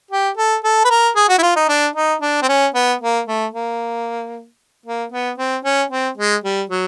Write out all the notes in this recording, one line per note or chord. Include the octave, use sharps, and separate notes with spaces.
G4
A4
A4
B4
A#4
G#4
F#4
E4
F4
D#4
D4
D#4
D4
C4
C#4
B3
A#3
A3
A#3
A#3
B3
C4
C#4
C4
G#3
G3
F#3